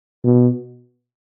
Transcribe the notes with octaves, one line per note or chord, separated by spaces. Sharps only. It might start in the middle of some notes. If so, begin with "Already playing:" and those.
B2